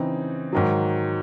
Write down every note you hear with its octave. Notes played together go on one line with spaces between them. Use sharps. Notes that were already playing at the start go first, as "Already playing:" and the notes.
Already playing: C#3 E3 C4 D#4
G#2 D#3 F#3